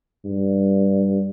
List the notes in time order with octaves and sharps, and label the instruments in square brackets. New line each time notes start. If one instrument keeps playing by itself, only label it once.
[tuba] G2